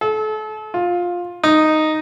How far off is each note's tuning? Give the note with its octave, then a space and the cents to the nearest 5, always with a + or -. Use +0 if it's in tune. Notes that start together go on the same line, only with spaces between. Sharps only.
A4 -35
F4 +15
D#4 -5